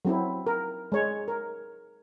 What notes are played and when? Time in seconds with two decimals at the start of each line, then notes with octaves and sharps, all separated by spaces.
0.05 F#3 C4 E4
0.47 A#4
0.92 G#3 C#5
1.28 A#4